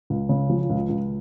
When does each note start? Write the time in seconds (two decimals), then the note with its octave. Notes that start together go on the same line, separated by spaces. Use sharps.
0.10 C#2
0.29 C#3
0.50 F3
0.70 C#2
0.89 C#2